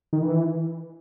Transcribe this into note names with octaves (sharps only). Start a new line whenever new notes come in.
D#3
E3